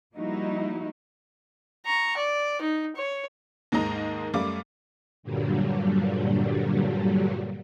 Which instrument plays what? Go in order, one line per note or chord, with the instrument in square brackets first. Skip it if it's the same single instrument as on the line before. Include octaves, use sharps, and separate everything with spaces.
[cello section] F3 G3 A#3 D#4 E4 F#4
[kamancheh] A#5 C#6
D5
D#4
C#5
[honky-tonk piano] D#2 G#2 G#3 A#3 D#5 A#5
F#2 G3 A3 F5 D6
[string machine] G2 A#2 D3 F#3 G3